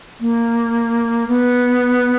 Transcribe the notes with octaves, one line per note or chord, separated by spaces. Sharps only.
A#3
B3